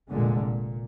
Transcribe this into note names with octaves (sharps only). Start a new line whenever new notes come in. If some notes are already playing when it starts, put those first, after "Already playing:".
F1 A#2 D3 G#3
A#2